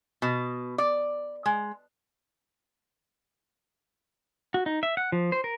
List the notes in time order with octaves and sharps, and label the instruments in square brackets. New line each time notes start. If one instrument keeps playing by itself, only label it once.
[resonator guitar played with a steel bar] B2
D5
G#3
[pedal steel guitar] F#4
D#4
E5
F#5
F3
C5
A#4